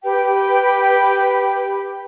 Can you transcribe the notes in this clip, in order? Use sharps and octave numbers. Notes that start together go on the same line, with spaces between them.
G4 B4 G5